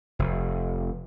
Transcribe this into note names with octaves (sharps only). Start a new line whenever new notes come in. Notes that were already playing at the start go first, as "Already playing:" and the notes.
F1